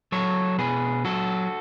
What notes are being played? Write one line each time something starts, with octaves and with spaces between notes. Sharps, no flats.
F#3 A4 C#5
B2 G#4 B4
F#3 F#4 A4